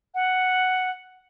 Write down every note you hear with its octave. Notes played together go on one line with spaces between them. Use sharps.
F#5